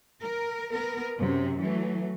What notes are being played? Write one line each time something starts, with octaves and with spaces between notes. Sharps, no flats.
A#4
B3 A#4
F#2 C3 F#3
E3 F#3 A3